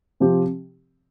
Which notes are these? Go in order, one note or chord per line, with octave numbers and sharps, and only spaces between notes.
C3 F3 C4 G4